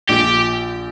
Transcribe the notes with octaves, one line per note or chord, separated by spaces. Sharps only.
A#1 G4